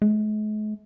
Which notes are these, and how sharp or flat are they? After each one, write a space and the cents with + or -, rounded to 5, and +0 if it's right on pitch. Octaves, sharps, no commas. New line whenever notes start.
G#3 +45